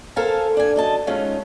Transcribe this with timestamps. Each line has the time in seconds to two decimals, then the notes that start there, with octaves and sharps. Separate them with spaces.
0.16 A4 A#4 C5 F5 G#5 A5
0.57 D4 G#5
0.76 F#2 D#5 A5
1.07 G#3 A3 C#4 D#4 F4